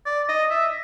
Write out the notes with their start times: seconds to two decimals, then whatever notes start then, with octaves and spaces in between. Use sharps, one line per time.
0.06 D5
0.29 D#5
0.50 E5